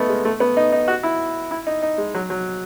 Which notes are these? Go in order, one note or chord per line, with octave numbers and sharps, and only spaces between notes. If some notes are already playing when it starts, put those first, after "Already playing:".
Already playing: A3 B3 D#4
G#3
A3
B3
D#4
D#4
F#4
E4
E4
D#4
D#4
G#3
F#3
F#3